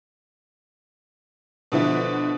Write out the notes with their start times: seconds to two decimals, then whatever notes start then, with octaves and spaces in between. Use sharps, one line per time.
1.72 B2 D3 F3 E4